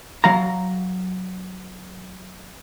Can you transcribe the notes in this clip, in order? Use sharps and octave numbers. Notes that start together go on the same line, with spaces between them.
F#3 F5 A#5